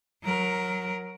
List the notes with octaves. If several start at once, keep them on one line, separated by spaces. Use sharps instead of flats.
F#3 A#4